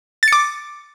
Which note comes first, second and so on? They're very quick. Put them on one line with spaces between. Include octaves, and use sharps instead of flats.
A6 C#7 D6